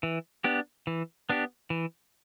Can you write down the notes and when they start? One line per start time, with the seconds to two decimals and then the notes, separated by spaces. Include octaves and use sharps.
0.03 E3
0.44 B3 D4 G4
0.87 E3
1.29 B3 D4 G4
1.70 E3